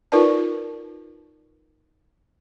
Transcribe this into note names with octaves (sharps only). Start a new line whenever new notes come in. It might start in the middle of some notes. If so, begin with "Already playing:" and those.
D#4 F4 A#4 B4 D5 A5